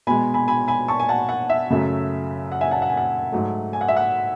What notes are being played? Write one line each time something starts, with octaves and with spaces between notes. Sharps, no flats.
B2 G#3 G#5 B5
G#5 B5
G#5 B5
G#5 B5
A5 C#6
G#5
F#5 A5
F#5
E5
F#2 C#3 F#3 A3
F#5
E5 G#5
F#5 A5
F#5
G#5
F#5
G#2 F#3 A3
G#5
F#5
E5
F#5